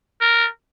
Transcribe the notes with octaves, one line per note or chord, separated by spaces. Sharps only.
A#4